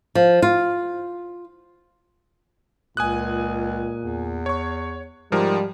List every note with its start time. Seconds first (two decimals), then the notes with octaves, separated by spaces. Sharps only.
0.15 F3
0.42 F4
2.97 C#2 A#2 G#5 D#6 F#6
4.03 E2
4.46 C#5 C#6
5.32 G#2 F3 G3 A#4